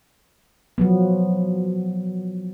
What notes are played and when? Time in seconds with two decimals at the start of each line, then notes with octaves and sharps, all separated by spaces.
0.78 F3 F#3 B3